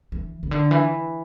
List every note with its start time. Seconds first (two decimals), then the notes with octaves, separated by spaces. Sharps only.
0.12 E3
0.43 C#3
0.51 D3
0.71 E3